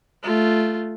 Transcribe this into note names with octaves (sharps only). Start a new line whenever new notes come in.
A3 F4